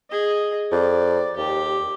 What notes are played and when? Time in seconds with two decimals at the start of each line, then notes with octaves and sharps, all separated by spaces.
0.10 G#4 D#5
0.71 F2 D5
1.37 D#2 G4